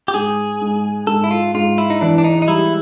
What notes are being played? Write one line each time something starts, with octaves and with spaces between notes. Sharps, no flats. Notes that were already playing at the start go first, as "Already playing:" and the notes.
G4
G#2 G#4
G#2
G#2 A4
E4
F4
G#2 F4
E4
D#4
E3 D4
D4
D#4
D#4
G3 E4